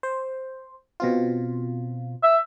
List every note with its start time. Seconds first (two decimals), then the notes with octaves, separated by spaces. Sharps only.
0.03 C5
1.00 B2 C4 F4
2.23 E5